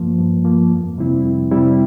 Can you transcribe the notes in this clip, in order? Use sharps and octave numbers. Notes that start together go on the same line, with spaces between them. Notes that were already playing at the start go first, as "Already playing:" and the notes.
Already playing: G2 F3 A#3
G2
F3 A#3
F2
C3 G3 C4 E4
F2
C3 G3 C4 E4